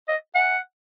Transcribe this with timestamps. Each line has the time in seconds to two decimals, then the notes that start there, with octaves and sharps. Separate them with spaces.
0.08 D#5
0.35 F#5